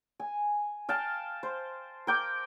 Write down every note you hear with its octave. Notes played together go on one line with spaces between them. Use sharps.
G#5
F5 G5 A5
C5
A#4 G5 D6